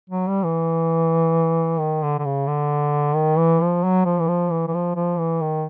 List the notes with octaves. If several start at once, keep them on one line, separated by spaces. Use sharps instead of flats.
F#3
G3
E3
D#3
D3
D3
C#3
D3
D#3
E3
F3
F#3
F3
E3
F3
E3
E3
F3
F3
E3
D#3